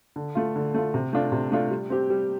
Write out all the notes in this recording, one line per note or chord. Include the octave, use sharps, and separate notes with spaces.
D3
A3 F4
D3
A3 F4
C3
A3 D4 F4
C3
A3 D4 F4
G3
C4 G4
G3